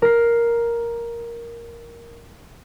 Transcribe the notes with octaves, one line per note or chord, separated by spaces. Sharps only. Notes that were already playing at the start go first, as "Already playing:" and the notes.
A#4 C7